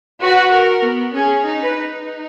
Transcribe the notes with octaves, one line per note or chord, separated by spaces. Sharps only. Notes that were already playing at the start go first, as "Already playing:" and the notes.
F#4 B4
A#4
B3
C#4 G#4
D#4
B4
D#4